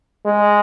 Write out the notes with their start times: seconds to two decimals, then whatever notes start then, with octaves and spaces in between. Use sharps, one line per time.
0.25 G#3